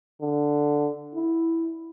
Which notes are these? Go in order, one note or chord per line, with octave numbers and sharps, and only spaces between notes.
D3
E4